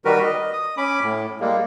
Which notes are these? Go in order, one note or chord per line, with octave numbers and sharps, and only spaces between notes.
D#3 G3 F#4 A#4 B4
D#5
D#6
C#4 B5 D6
A2
G3 G#3 A#3